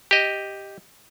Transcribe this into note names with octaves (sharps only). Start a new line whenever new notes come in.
G4 D#5